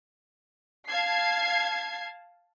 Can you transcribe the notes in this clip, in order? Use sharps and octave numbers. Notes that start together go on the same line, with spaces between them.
F5 A5 G#6 C7